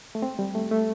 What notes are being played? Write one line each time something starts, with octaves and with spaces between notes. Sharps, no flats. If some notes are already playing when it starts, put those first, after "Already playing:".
A3
C4
G3
A3
A3